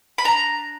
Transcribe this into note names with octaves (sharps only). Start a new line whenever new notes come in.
B5
D4 A#5